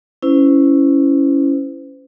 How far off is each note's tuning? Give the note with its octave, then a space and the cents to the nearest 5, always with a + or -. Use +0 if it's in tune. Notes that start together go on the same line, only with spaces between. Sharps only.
C#4 +0 E4 +0 C5 -40